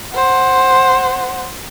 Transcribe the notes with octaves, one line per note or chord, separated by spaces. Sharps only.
C5 F#5